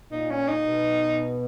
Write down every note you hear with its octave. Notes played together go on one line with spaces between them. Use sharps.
A#2 D#4
C#4
D#4
B2